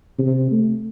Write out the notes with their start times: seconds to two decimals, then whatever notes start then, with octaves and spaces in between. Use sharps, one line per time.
0.18 C3
0.51 A3